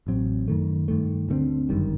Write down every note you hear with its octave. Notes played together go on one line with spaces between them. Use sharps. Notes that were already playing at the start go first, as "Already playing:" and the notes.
A1 A2 F#3 C4
F#2 D#3 A3
G2 D#3 A3
D2 D3 A3 C4
G1 F#2 D#3 G3